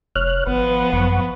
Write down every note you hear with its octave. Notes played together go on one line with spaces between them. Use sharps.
F1 C#5 F6 F#6
G#1 F3 B3 B4
G#1 F#2 F#5 C#6